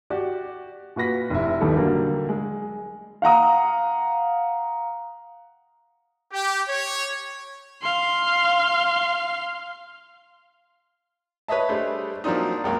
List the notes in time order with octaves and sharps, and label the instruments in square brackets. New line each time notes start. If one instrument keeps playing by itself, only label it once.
[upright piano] F#4 G4 D5
A#2 F#4 B4 A#6 B6
F1 E4
D#1 D#3 G3 B3 D#4 A4
D3 F#3 G3 A#3
G#3
F5 F#5 A#5 D#6
[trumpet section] G4
C#5
[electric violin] F5 C6
[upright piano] B4 C#5 D#5 E5 A5
G3 A3 D4 G#4 C5
F3 F#3 A#3 C4 D4 D#4
C#2 F#2 A#3